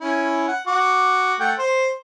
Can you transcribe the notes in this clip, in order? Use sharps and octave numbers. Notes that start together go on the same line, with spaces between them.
C#4 E4
F#5
F#4 D6
A3 F#5 G5
C5